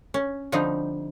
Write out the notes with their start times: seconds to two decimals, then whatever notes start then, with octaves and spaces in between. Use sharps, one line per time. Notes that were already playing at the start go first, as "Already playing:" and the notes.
0.14 C#4
0.52 D3 F3 G3 C4 D#4